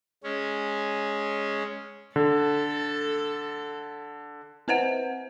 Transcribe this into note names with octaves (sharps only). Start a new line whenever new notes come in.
G#3 C#4
D3 A4
C4 B4 C5 F#5